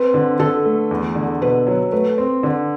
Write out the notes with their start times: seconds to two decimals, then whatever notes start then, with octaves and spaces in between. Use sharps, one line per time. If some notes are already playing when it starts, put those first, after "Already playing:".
Already playing: C4 B4
0.14 D3
0.39 D3 A4
0.65 A3
0.91 E2
1.15 D3
1.41 B2 B4
1.67 F#3
1.92 A3 B4
2.18 C4
2.43 D3